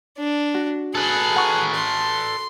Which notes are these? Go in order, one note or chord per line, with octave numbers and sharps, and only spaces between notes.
D4
F#4
G#4 A4 B4
F#5 C#6
C6